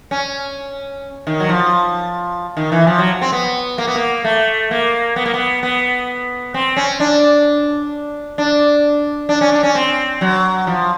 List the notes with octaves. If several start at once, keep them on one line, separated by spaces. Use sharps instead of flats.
C#4
D#3
F#3
F3
D#3
E3
F3
F#3
C4
B3
A#3
B3
A#3
A3
A#3
B3
A#3
B3
B3
C4
C#4
D4
D4
D4
C#4
D4
C#4
C4
F#3
F3